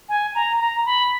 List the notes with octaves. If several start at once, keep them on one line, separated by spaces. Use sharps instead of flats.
G#5
A#5
A#5
B5